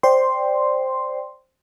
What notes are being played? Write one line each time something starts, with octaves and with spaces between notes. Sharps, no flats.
C5 D5 G5 C6